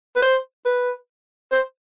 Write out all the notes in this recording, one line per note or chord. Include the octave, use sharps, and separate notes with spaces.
B4
C5
B4
C5